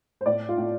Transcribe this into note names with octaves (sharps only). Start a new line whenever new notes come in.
C5
A2 D5
F4
A2